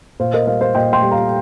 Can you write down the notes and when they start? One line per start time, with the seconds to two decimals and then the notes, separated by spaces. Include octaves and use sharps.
0.19 A#2 C5 F5
0.33 A#4 D#5
0.47 G3 C5 F5
0.61 C5 F5
0.75 A#2 D#5 G5
0.93 G5 C6
1.02 G3
1.11 F5 A#5